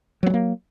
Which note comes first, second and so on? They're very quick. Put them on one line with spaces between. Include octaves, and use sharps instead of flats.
F#3 B3 G3 A#3